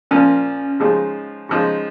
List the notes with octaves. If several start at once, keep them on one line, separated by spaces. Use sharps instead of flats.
A#2 F3 A#3 C#4
C#3 F3 G#3 D#4
C#3 F3 G#3 D#4